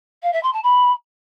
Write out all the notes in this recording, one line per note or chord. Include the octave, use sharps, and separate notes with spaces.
F5
E5
C6
A5
B5